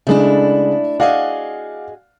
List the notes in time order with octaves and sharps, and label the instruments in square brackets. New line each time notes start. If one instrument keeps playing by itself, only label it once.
[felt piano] C#3 G#3 [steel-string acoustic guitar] A3 D4 E4
[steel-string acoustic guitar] F#4 G#4 D#5 [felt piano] D5 F5 F#5